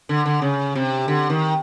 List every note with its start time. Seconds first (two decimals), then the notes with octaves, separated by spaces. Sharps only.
0.09 D3
0.26 D3
0.42 C#3
0.75 C3
1.08 D3
1.30 D#3